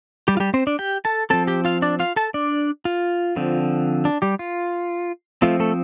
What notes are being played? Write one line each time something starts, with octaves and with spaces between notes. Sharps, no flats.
G3 G4
F4
G3 G4
C4 C5
D4 D5
G4 G5
A4 A5
F3 C4 A4 A5
G4 G5
F4 F5
D4 D5
F4 F5
A4 A5
D4 D5
F4
D3 F3 C4
D4
G3 G4
F4
F3 A3 C4 F4
A3 A4